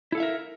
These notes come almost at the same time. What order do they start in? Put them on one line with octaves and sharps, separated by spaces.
E4 A4 F5 E5 A#4